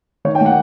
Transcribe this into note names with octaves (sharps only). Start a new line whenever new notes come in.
D#3 C#5
G5
A#3
F#5